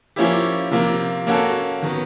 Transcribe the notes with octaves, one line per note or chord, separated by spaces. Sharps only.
F3 A#3 C#4 E4 G4
C3 F3 A#3
A#3 C#4 F#4 A4
D#3 F#3 B3